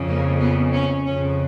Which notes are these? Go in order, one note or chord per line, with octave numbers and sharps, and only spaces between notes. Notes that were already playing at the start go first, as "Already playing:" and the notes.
Already playing: F2 C#3
A#3
B3
C#4
F2 C#3 C#4